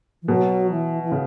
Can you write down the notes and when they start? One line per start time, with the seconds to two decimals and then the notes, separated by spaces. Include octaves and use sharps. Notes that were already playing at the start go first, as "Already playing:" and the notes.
0.22 E3
0.28 B2 F#3
0.70 E3
1.03 E3
1.12 C#3